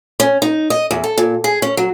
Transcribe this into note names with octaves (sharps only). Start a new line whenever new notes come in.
C#4
D#4
D#5
E2
A4
A#2
G#4
C#4
F#3